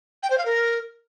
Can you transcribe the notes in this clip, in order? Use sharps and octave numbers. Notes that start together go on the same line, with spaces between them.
G5
C5
F5
A#4